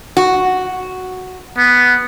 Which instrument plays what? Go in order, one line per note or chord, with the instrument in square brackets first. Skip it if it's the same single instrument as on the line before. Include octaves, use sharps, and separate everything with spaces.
[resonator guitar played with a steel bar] F#4
[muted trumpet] B3